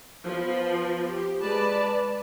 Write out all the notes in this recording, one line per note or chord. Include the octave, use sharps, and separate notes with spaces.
F3 B3
G4
G#3 B4 D5 A5